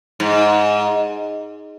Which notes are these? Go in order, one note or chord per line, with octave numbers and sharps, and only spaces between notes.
G#2